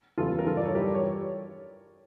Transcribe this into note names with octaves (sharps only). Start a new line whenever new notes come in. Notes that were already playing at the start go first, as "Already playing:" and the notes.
E2 C#3 E3 G3 F4 A4
A#4
G2 F3 F4 A4
D5
A4 C#5
G2 E3 G3 G4 A#4
C#5